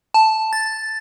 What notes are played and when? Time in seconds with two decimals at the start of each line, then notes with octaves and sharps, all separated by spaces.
0.14 A5
0.53 A6